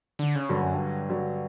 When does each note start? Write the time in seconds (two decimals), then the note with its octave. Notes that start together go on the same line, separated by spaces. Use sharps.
0.19 D3
0.35 C#3
0.49 G2 D3 F#3
0.62 F#2
0.74 G2
1.10 D3 F#3